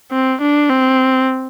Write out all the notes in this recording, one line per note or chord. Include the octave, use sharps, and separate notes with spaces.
C4
D4
C4